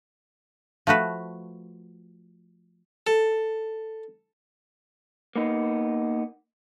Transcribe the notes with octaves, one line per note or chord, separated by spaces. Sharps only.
F3 A3 F#4 B4
A4
A#3 B3 D#4